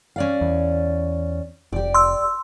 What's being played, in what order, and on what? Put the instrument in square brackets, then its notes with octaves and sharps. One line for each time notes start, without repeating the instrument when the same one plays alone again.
[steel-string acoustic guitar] C#4 D5 F5
[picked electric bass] E2
[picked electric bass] F1 [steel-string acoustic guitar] G4 D5
[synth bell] C6 E6